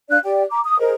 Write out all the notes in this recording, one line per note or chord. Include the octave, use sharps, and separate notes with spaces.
D4 D5 F5 F#6
G4 D5 G5
A#5 D6
D#6
G#4 A#4 C5 D#5